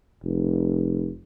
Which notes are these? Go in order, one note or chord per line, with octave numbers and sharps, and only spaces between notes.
F1